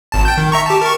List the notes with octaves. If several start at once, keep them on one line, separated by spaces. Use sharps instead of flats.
G#1 A5
G5 G6
D#3
E5 A#5 C#6
G4 A5
A#4 C#6